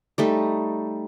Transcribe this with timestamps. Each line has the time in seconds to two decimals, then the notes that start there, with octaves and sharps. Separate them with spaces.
0.18 G3 A3 D#4